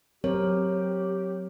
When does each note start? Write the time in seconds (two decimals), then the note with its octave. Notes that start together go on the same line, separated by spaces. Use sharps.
0.24 F#3 C4 G4 A#4 C#5